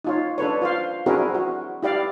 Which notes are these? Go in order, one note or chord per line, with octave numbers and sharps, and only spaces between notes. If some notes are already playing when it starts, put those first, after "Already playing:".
D#4 F4 C#5
D4 A4 B4 C#5
F4 C5 F5
C4 D4 E4 F#4 G#4 A#4
F#4
E4 G4 D5 F5